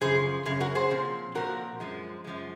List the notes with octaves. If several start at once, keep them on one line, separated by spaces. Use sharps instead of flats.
F#2 C#3 F3 G#4 C5
F#2 C#3 G#4
F#4 A#4
G#4 C5
A#2 F3 C4
A#2 F3 C4 F#4 A#4
F#2 F3 G#3
F#2 F3 G#3